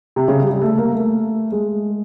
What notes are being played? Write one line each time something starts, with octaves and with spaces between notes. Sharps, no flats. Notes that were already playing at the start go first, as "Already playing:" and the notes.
C3
C#3
G3
G3
A3
A#3
A3
G#3